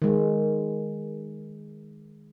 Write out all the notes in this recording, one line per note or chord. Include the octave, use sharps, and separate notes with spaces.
D#3 G#3